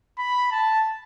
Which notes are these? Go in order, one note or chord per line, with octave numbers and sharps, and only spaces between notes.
B5
A5